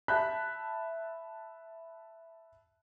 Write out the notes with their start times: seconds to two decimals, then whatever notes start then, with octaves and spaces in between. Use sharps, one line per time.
0.08 E5 A5 B5 F#6 G6 B6